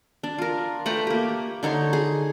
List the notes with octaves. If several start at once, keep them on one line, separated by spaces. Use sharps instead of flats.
D4
F4 A#4
A3 B4 G5 A#5
A#3 G4
D3 D#4 C#5 C6
G#4